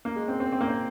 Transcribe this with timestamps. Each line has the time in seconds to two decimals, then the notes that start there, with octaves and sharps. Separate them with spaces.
0.05 A#3
0.16 G#3
0.28 C4
0.40 C4
0.52 C4
0.61 A#3
0.68 C4